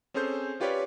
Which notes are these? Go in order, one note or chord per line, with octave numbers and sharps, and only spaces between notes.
C4 C#4 G#4 A4 C5 G6
C#4 F4 G4 B4 C#5 D5